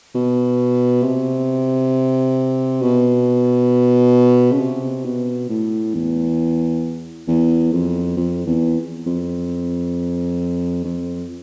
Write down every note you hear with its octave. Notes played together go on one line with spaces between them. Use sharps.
B2
C3
B2
C#3
C3
B2
A2
E2
E2
F2
F2
E2
F2
F2